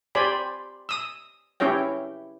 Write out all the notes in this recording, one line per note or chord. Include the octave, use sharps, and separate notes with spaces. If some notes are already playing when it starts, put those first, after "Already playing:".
G4 C5 D5 G#5 B5
D#6 E6
C#4 E4 G4 C#5 G5